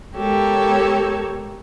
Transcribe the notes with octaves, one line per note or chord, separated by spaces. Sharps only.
G#3 B3 G4 A4 A#4 C#5